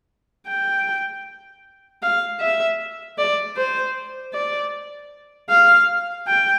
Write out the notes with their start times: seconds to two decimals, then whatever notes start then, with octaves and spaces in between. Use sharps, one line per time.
0.47 G5
2.02 F5
2.40 E5
3.18 D5
3.56 C5
4.33 D5
5.50 F5
6.27 G5